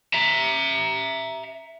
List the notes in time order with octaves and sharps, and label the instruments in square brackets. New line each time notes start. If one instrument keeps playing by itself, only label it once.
[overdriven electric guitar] E5 A#5